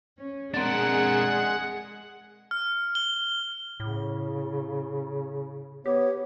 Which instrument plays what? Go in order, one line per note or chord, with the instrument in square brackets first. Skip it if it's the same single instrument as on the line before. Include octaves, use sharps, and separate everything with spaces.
[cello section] C#4
[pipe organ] G#3 F#5 [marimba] C4 A6 [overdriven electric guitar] D4 A#4 [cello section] G#4
[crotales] F6
G7
[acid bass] A2 [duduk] C#3
[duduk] B3 [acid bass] G4 [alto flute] C#5